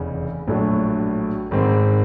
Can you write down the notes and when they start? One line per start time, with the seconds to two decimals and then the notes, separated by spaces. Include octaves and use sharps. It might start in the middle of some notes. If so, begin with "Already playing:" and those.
Already playing: F1 E2 C#3
0.48 A#1 A2 F#3 A3 D4
1.51 G#1 G#2 D#3 G#3 C4